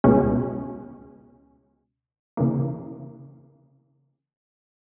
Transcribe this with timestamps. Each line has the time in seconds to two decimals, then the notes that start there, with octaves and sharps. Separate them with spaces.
0.04 C#2 B2 G#3 C#4
2.37 C#3 E3 A#3